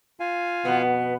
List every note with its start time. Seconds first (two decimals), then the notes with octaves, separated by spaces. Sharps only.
0.20 F4 F5 G#5
0.65 F2 B2 B3